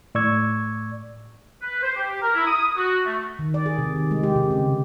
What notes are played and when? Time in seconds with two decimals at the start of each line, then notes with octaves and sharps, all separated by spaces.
0.15 A2 D5 C#6 E6 G#6
1.62 B4
1.82 C5
1.95 G4
2.21 A#4
2.34 E4
2.46 D#6
2.75 F#4
3.05 A3
3.39 D#3
3.54 D5
3.66 G#4
3.78 C3
3.96 D#3
4.11 G#3
4.23 G4
4.36 C3
4.51 C#3